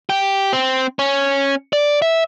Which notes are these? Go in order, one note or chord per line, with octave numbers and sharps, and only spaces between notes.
G4
C4
C#4
D5
E5